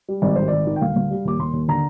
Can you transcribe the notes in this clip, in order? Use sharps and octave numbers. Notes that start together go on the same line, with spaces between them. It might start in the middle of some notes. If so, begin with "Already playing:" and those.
G3
G#1 D5
G#1 C5
D#3 D5
D#3
G5
D2 F5
D2
G3
D#2 D6
D#2 C6
D#2
D3 A#5